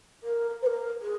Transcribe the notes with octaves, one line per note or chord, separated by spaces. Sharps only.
A#4
C5
A#4
G#4